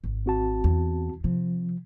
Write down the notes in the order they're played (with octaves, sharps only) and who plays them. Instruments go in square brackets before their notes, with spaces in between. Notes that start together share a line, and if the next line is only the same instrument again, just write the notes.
[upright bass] G#1
[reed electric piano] C4 F#4 A5
[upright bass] E2
[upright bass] C3 [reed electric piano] F3